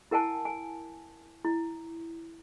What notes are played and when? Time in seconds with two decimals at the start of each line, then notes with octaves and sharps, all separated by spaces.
0.11 E4 A#4 F#5 G#5 A5
0.45 G#5
1.45 E4